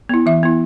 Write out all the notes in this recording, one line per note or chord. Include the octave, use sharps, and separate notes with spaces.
B3 E4
E3 E5
B3 E4